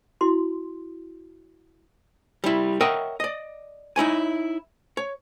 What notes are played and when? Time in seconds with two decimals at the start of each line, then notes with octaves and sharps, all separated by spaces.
0.21 E4 F#4 C6
2.44 G3 E4
2.81 A#4 C#5 D#5 E5 F#5 G5
3.20 D5 D#5
3.96 D#4 E4 C#5 G#5
4.97 C#5